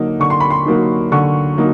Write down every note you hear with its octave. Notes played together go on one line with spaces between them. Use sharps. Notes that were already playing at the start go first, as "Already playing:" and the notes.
Already playing: D3 F#3 A#3 D#4
D3 C#6
C6
B5
C6
F#3 A#3 D#4
D3 C#6
F#3 A#3 D#4